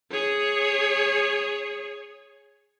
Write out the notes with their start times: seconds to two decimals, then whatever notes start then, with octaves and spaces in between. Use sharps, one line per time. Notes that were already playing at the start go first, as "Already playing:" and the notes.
0.12 G#4 C#5